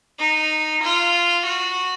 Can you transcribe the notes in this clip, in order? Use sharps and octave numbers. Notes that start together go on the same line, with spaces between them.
D#4
F4
F#4